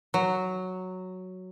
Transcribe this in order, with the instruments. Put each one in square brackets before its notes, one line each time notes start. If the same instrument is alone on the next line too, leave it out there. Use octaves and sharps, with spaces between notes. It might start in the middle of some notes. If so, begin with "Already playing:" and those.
[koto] F#3